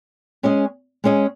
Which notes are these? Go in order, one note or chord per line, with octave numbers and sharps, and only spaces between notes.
G#3 C#4 G#4 D#5
G#3 C#4 G#4 D#5